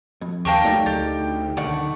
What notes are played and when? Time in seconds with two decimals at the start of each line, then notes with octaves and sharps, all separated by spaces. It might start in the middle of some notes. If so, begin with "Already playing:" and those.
0.21 F2
0.45 D#2 G4 A#4 F5 G5 A5 C#6
0.65 F#3 A3 D#4 D5
0.86 D2 G4 A6
1.57 B1 D3 D#3 A3 D5 F#5